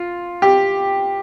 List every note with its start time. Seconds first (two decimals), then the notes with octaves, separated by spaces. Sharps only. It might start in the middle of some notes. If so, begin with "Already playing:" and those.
Already playing: F4
0.42 G4